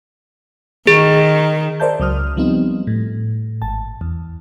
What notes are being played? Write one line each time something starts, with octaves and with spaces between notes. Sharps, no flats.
D#3 G#4
A#4 C5 D5 E5 A5 G6
C#2 F#3 D#6 F6
F3 G3 B3 C4 D#4
A2
G#1 A5
E2